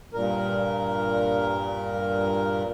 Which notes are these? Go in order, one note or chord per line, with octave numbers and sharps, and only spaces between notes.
G2 A#2 A#4